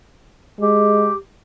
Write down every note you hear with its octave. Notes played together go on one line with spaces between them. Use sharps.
G#3 G4